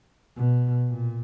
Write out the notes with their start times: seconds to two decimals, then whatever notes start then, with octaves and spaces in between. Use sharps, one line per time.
0.36 B2
0.89 A#2